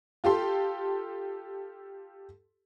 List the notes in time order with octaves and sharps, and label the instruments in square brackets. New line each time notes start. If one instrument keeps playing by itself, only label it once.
[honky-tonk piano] F4 G4 A4 C6